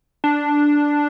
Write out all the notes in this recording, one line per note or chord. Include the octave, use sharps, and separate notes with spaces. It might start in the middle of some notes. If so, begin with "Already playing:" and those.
D4